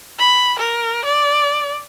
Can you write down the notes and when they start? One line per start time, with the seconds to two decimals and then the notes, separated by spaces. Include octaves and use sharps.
0.19 B5
0.59 A#4
1.05 D5